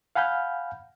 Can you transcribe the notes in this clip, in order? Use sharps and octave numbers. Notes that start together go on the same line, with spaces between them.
F5 F#5 G#5 B5 F6 G6